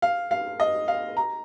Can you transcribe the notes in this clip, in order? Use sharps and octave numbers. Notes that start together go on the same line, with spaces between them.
F5
F5
D#5
F5
A#5